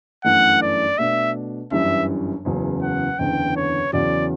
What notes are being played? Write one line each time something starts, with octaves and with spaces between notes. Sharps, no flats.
G1 F#2 E3 A3 F#5
D5
B2 A3 D4 E5
G1 F#2 E3 G3 E5
F#1 E2 C#3 F#3
F#5
F#1 E2 D3 G5
C#5
E2 C#3 F#3 C#4 D5